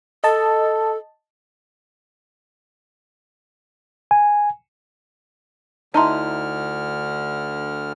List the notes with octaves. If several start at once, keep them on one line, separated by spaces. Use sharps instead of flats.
A4 D#5 A5
G#5
D2 D3 D#4 E4 A5 A#5 C6 F6